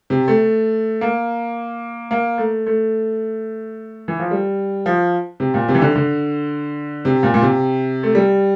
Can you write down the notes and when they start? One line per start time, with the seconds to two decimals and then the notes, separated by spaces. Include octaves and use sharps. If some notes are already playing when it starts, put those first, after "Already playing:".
0.10 C3
0.28 A3
1.01 A#3
2.11 A#3
2.38 A3
2.66 A3
4.08 E3
4.20 F3
4.31 G3
4.86 F3
5.40 C3
5.54 A#2
5.68 C3
5.75 E3
5.82 D3
5.96 D3
7.05 C3
7.23 A#2
7.34 A#2
7.42 C3
8.03 A3
8.15 G3